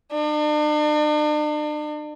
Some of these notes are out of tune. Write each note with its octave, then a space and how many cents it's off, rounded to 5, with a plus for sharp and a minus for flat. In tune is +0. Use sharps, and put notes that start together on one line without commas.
D4 +40